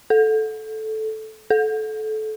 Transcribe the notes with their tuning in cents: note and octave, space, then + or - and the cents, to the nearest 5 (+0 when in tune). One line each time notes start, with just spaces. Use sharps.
A4 -10
A4 -20